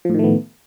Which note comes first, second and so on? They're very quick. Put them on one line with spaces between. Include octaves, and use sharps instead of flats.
F3 A2 D#3 A3 B3